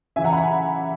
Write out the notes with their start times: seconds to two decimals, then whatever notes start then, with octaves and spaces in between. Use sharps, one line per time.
0.16 C#3 E3 E5 G#5
0.24 F#5 A#5
0.33 G#5 B5